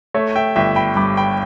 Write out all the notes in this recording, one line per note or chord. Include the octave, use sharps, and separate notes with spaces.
A3 C#5 E5
E5 G5
G1 E5 G5
G5 B5
G2 B5 D6
G5 B5